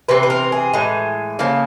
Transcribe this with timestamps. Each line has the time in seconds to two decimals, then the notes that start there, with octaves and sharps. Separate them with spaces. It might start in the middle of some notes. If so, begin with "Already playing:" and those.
0.08 C3 E3 C4 B4
0.23 B4
0.30 A#4
0.52 G#4
0.73 A2 E3 G#3
1.39 C#3 F3 A#3